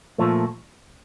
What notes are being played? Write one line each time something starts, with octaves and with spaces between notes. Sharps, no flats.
A#2 F3 A3